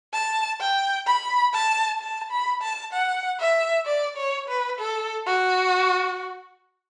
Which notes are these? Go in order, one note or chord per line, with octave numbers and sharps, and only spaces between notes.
A5
G5
B5
A5
A5
B5
A5
F#5
E5
D5
C#5
B4
A4
F#4